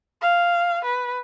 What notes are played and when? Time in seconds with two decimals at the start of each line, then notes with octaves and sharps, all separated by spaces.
0.21 F5
0.84 B4